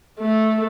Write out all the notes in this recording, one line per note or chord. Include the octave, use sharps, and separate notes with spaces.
A3